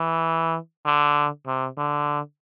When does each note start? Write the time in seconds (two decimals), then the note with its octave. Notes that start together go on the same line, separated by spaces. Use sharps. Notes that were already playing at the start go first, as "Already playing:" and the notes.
Already playing: E3
0.85 D3
1.47 C3
1.77 D3